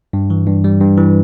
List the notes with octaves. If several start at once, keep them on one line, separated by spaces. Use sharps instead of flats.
G2
E3
G2
G3
G2
E3